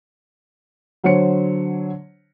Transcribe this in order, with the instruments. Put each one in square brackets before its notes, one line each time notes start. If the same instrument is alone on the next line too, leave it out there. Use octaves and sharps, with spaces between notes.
[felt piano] D3 F#3 C5 C#5 C#7